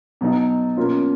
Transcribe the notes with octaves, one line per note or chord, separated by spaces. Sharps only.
B2 F#3 B3 D#4
B2 A#3 C#4 F4